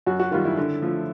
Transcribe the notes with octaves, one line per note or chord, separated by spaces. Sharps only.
F#2 F#4
F#4
D#3 G3 F4
E4
D3
F3 A3